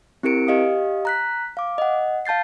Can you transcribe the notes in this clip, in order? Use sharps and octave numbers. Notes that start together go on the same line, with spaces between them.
C4 E4 G4 A#4 C#7 D7
G4 D#5 F5 D#6
A#5 F#6 B6
F5 D6
D#5 F#5
F5 A5 G6 A6 C7